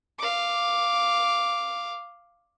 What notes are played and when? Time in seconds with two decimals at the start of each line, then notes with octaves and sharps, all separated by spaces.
0.19 F5 D6